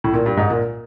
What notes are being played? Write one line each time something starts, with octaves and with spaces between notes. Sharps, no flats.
A2
A#2
G2
G#2
A#2